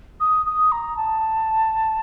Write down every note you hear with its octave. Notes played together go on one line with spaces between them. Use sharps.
D#6
D#6
A#5
A5